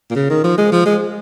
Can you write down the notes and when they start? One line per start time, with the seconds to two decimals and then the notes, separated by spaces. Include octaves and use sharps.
0.10 A#2
0.15 C#3
0.29 D#3
0.44 F3
0.58 G#3
0.72 F3
0.86 G#3